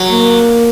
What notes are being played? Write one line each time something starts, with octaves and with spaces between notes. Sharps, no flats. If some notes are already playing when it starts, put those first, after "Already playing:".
Already playing: F#3
A#3